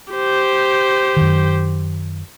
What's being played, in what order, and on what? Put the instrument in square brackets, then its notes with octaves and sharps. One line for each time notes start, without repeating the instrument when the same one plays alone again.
[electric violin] G4 C5
[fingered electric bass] F#2 D#3